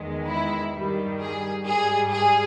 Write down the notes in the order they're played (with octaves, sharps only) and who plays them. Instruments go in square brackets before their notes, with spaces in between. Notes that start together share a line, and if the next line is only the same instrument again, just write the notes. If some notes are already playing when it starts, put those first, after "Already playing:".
Already playing: [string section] E2 D#3 G#3
E4
G2 D#3 G3
G#4
G#2 G3 G#4
G#4